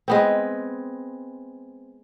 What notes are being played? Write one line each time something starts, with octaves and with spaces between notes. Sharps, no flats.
G#3 B3 C4